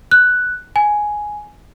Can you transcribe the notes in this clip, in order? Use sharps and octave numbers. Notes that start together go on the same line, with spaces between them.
F#6
G#5